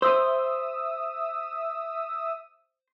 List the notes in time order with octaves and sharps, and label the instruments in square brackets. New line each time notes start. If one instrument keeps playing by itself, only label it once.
[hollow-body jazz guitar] C5 [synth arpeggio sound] E5 D#6 E6